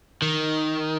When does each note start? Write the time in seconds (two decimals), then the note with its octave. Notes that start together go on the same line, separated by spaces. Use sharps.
0.22 D#3